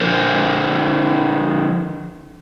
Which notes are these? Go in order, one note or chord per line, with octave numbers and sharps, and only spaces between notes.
D3 F3 A#4 C5